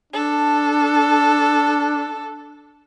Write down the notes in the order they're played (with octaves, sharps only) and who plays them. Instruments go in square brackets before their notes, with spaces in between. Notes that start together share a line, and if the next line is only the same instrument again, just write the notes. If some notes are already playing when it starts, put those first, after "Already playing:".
[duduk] D4 [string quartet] A4